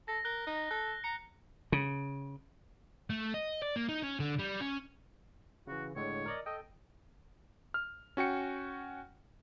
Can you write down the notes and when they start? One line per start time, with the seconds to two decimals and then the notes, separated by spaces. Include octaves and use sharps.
0.08 A4 A#6
0.25 A#4 F#6 G7
0.47 D#4
0.71 A4 F#6
1.04 A#5 C#7
1.72 C#3
3.10 A3
3.34 D#5
3.62 D5
3.76 A#3
3.88 D#4
4.03 C#4
4.20 D3
4.39 G3
4.61 C#4
5.67 C#3 E3 F#4
5.96 A2 D3 G#3 C#5
6.26 A#4 D5 D#5
6.46 A4 D#5 G5
7.74 F6
8.17 C#4 F#4 G5 C#7